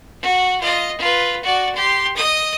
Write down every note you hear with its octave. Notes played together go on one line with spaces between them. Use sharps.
F#4
F4 D#5
F4 B4
F#4 D5
G4 C6
D#5 D#6